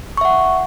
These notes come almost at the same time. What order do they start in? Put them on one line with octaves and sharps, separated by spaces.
C#6 E5 F#5